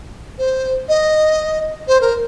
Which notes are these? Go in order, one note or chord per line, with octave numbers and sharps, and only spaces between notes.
C5
D#5
C5
A#4